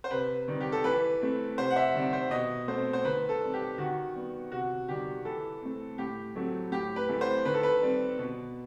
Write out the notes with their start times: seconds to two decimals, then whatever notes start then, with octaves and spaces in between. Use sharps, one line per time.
0.04 C5
0.11 C3 B4
0.48 D#3 G3 C4
0.61 G4
0.72 A4
0.84 E3 B4
1.21 A3 C4
1.58 C3 C5
1.71 F#5
1.76 E5
1.94 D#3 G3 C4
2.13 C5
2.31 B2 D#5
2.68 A3 C4 C5
2.93 C5
3.05 D#3 B4
3.29 A4
3.41 G3 C4
3.54 G4
3.78 D#3 F#4
4.15 G3 B3
4.51 C3 F#4
4.88 D#3 G3 G4
5.25 E3 A4
5.62 A3 C4
5.98 A2 G4
6.35 F#3 A3 C4
6.72 A2 G4
6.96 B4
7.09 E3 A3 C4
7.21 C5
7.45 D#3 B4
7.54 A4
7.63 B4
7.82 G3 C4
8.19 B2